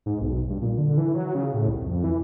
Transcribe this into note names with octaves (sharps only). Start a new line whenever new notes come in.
G#2
B1
G2
A#2
D3
E3
F#3
C#3
A2
C2
F2
E3